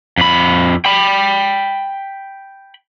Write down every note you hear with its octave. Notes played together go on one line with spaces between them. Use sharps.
F2 B5
G5 B5